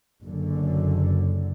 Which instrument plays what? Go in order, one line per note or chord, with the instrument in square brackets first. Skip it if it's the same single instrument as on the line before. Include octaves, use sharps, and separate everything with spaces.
[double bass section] F#1 F#2 D3